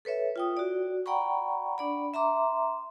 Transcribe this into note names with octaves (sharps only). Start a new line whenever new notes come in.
A4 B4 C#5 E5
F4 G5 D#6
F#4 D5
D5 F#5 G5 A#5 B5 C#6
D4 D5 B5
E5 A#5 C6 D6